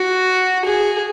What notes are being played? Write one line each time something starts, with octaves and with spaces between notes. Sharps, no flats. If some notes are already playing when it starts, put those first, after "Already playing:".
Already playing: F#4
G#4